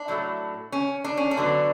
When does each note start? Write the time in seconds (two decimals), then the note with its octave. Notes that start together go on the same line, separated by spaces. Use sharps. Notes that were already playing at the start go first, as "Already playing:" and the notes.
Already playing: D4
0.08 A2 F#3 A3
0.72 C#4
1.04 D4
1.17 C#4
1.31 D4
1.37 D3 F#3 B3